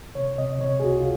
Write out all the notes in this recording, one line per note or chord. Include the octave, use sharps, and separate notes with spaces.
C3 C#5
C3 D#5
C3 C#5
G#4
C#2 F#4
F4